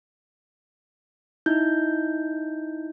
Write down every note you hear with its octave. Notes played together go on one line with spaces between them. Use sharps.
D#4 E4 G6